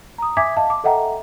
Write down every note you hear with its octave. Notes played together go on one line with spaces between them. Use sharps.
A#5 D#6
E5 G#5 D6 G#6 B6
D#5 F5 A5
D6
A4 D#5 E5 F#5 G5 A#5